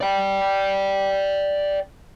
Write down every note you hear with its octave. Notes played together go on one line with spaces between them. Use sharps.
D5 G5